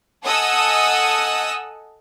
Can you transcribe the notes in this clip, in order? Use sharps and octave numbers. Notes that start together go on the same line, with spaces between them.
A4 D#5 F#5 G#5 D#6 E6